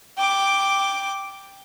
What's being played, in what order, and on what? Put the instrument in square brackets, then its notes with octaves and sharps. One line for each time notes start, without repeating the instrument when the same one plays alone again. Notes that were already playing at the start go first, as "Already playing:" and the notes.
[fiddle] G5 D6